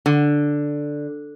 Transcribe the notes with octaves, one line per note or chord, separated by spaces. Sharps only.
D3